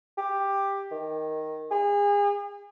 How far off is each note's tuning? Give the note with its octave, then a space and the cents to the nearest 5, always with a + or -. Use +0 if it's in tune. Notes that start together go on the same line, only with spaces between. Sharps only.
G4 +10
D#3 +0
G#4 -35